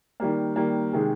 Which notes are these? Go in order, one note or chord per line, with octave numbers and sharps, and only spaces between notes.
D#3 G3 A#3
D#3 G3 A#3
C3 D#3 G#3